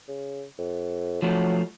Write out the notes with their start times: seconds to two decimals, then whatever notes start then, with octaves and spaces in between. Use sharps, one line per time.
0.08 C#3
0.58 F2
1.22 F3 F#3 A3